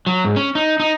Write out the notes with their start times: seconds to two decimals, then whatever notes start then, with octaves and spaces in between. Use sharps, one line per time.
0.07 F#3
0.25 G#2
0.36 C#4
0.55 D#4
0.80 D#4